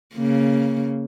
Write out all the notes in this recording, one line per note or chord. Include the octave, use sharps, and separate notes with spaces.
C#3 A#3